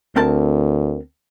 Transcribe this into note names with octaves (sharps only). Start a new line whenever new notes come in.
D2 C4 A#4 A5